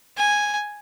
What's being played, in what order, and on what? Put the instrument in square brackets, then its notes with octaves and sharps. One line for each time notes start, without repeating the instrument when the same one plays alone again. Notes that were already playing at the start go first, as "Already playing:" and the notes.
[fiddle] G#5